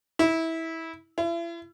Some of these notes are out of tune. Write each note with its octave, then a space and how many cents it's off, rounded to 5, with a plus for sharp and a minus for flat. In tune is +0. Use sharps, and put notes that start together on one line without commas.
E4 -20
E4 +40